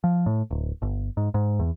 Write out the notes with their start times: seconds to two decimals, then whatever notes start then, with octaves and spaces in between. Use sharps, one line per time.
0.04 F3
0.26 A2
0.51 D1
0.82 G1
1.17 G#2
1.34 G#2
1.59 E2